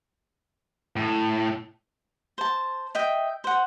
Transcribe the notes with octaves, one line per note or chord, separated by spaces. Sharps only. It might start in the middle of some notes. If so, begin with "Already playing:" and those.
A2
C5 A5
D#5 E5 G5
C5 F#5